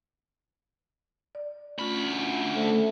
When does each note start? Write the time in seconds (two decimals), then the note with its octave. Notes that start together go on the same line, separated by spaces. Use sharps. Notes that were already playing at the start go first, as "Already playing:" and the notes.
1.35 D5
1.79 D2 A3 C#4 F4 B5
2.56 D3 A3 C#4 C5